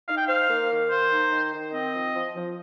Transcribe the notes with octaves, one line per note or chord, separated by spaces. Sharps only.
D#4 F5
G5
C5 F5
A#3
D#3
A#3 C5
D#4
D#3
D#3
C4 D#5
F3
F3
F3